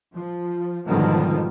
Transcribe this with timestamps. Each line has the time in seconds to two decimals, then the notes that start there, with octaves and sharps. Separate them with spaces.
0.15 F3
0.88 G#2 B2 D3 D#3 F3 G3